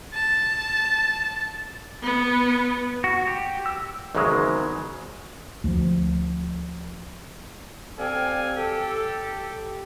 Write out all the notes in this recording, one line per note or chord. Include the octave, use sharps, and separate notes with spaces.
A5
B3
F#4
G4
E6
G#1 E2 G#2 C#3 F#3 G#3
D2 F3
C4 G4 A4 D5 F5 G#5
G4 A4